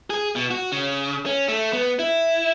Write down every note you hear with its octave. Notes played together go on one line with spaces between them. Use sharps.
G#4
B2
F#4
C#3
C#4
A3
B3
E4